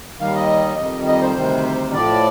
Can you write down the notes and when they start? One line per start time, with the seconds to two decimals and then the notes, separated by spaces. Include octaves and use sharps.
0.20 D#2 D#3 G3 F5
0.34 D#5
0.77 F2 D#3 G3
1.07 D#5
1.22 C5
1.36 D2 C3 D#3 G3
1.94 A2 F3 D5